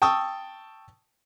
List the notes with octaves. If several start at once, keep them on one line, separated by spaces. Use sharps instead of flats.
G5 A5 C#6 D#6 E6